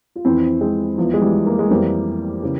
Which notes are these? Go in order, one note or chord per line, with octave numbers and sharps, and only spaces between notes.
F4
F2 E3 C4 E4
G#3 C4
E2 E3 F3
G#3
E3 G3
A#3
G#3
F2 E3 G3 A#3
C#3 E3